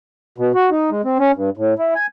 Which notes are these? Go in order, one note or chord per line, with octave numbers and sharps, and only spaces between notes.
B2
F#4
D#4
G#3
C4
C#4
G2
A2
E4
G#5